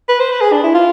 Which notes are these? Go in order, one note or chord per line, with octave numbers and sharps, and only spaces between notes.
B4
C5
B4
G#4
D4
E4
F4